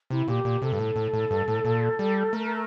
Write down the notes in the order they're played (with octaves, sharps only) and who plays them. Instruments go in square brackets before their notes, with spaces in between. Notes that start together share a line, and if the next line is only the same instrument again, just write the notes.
[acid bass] C3 [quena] E4
[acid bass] A#2 [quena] G4
[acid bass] A#2
[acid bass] C3 [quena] A4
[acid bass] G2
A2
A2
A2
G2
A2
A#2
G3
[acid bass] A3 [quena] A#4